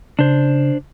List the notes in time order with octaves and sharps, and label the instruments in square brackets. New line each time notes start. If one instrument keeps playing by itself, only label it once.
[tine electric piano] C#3 [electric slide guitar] D4 C5